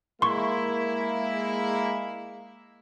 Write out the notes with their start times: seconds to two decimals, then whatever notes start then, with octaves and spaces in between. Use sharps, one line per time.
0.22 G#3 A#3 E4 C6 C#6